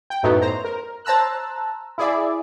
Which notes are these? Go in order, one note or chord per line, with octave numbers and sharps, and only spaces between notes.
G5
F#2 A2 F#3 A3 B3 D#4
C5 A#5
A#4
C5 A5 A#5 E6 F#6
E4 G#4 D5 E5